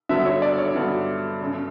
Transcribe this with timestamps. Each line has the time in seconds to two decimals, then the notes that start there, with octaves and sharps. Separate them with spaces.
0.09 G2 D3 F#3 B3 E5
0.26 C#5
0.42 D5
0.58 C#5
0.75 G2 D3 F#3 B3
1.41 G1 F#2 C#3